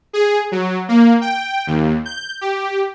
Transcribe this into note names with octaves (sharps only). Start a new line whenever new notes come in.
G#4
F#3
A#3
G5
D#2
G6
G4